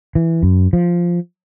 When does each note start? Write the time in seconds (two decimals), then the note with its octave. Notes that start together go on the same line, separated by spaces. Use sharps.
0.15 E3
0.43 F#2
0.73 F3